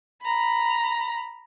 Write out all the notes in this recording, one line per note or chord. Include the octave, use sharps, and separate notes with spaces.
A#5 B5